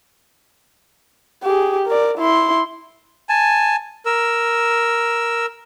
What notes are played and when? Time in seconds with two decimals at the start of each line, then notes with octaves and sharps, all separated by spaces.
1.44 G4 G#4
1.87 A#4 D5
2.18 E4 C6
3.29 G#5 A5
4.06 A#4 E6